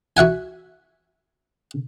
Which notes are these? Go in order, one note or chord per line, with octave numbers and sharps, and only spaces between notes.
F#4 E5 F#5 G#5